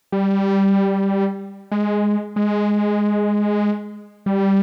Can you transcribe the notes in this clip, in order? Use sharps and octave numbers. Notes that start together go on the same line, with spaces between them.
G3
G#3
G#3
G3